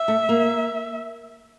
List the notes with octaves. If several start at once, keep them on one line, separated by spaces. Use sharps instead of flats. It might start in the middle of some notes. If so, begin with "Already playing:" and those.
Already playing: E5
A3
A#3